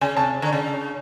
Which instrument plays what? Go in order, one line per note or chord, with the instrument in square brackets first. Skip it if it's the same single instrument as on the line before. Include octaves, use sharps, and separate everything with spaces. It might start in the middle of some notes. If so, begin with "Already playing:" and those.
[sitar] C#3 [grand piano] G#5
[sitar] C3 [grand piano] A5
[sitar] D3
C#3